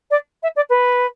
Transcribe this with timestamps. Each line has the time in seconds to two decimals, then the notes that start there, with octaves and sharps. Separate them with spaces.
0.10 D5
0.42 E5
0.56 D5
0.69 B4